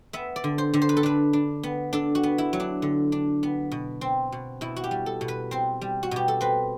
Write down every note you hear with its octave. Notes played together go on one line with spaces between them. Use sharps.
B3 E5
D5
D3
C5
D3
C5
B4
A4
D4 B4
D4
B3
D4 A4
F#4
B3
E4
F#3
D4
D3
D4
B3
B2
C4
B2
B2 E4
F#4
G4
G3
A4
B2
B4
C4 C5
G3
F#4
B2 G4
A4
C4 B4